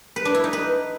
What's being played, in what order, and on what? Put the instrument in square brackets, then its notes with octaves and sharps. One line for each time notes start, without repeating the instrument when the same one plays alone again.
[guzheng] B4
D4
E4
D#4
B4